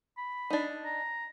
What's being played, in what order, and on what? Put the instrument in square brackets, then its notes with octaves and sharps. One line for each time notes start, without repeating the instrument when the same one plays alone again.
[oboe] B5
[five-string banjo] D4 D#4
[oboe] A#5